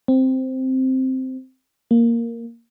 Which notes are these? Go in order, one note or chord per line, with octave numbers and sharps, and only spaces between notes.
C4
A#3